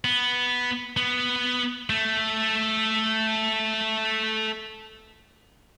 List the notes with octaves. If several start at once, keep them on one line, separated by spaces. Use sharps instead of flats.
B3
B3
A3